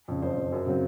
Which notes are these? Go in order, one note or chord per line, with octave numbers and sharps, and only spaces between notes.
F2 C#3
F#1 C5
F2 C#3
F#2
C#3 F#3 C4